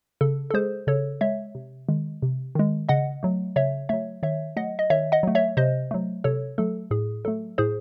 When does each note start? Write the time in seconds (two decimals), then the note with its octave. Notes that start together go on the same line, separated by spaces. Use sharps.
0.21 C#3 A4
0.50 A4
0.54 G#3 G#4 C5
0.87 C#3 A4 C#5
1.21 G#3 C#5 E5
1.55 C3
1.89 D#3 G#3
2.22 C3
2.55 D#3 G#3
2.89 C#3 D#5 F#5
3.23 F#3 A3
3.56 C#3 C#5 E5
3.89 F#3 A3 C#5 E5
4.23 D#3 C#5 E5
4.57 F#3 A3 D#5 F#5
4.79 D#5
4.90 D#3 C#5 E5
5.12 D#5 F#5
5.23 F#3 A3
5.35 C#5 E5
5.57 C3 C5 D#5
5.91 F#3 A3
6.24 C3 A4 C#5
6.58 F#3 A3 A4
6.91 A2 G#4
7.25 F#3 A3 A4
7.58 A2 G#4 C5